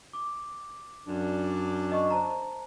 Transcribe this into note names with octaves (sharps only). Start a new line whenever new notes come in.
D6
F#2 D4
D#5 C#6
C5 A5 A#5